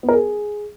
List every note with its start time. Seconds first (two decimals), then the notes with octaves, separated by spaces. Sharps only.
0.03 B3
0.09 A#4
0.14 G#4